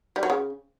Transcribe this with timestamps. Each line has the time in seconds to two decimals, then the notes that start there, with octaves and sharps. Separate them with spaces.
0.16 G3
0.23 F#3
0.30 C#3